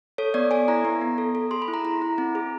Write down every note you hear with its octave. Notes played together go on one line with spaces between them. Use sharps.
A4 C#5
B3 D5
A4 G#5
E4 A#5
B3
B3
A4
A4
G#4 C6
B5
E4
A#5
E4 A#5
E4
C4
G#4